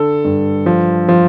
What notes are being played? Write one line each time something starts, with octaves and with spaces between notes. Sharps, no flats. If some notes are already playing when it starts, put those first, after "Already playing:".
Already playing: D3 A4
G2
F3
F3